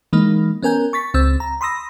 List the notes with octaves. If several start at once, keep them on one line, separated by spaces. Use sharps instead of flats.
E3 G#3 A#3 D#4
B3 C#4 A#4 G#5 G6
C#6 A6 B6
C#2 C4 E6 A6
A#5
B5 C6 D#6 E6 A#6